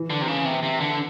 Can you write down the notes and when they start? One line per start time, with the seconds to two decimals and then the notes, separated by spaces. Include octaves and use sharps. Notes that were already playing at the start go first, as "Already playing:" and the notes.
Already playing: E3
0.10 D3
0.22 C3
0.28 C#3
0.45 C3
0.63 C3
0.80 D3